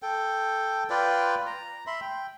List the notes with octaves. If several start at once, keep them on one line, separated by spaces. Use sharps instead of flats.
A4 G5
F4 B4 D5 G5
A#5
E5 B5 C6
G5